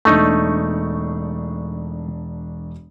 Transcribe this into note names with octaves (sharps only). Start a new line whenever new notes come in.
E1 A3 D4 D#4 C#6